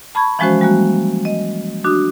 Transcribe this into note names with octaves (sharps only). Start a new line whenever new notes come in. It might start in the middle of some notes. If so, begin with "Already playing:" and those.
A5 B5 C#6 G#6
E3 F3 G#3 C#4 F#4 C5
G3 G#3 A#3 F#4
D#5
D4 F#4 D#6